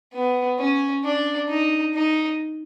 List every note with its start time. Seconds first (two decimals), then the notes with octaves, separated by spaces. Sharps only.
0.14 B3
0.59 C#4
1.04 D4
1.49 D#4
1.94 D#4